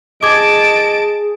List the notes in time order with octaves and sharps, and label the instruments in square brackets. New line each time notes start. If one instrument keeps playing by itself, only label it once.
[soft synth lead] G#4 [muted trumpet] D#5 [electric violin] A5 D7 [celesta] D6 G#6